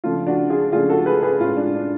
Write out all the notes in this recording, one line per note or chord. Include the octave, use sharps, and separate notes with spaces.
C#3 F3 A3 D4 F4
D4 F#4
F4 G#4
C#3 F3 A3 D4 F4 G#4
F#4 A4
G#4 B4
G#4 B4
A2 G#3 C#4 F4
D4
D4